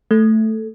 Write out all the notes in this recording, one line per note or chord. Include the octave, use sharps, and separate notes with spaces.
A3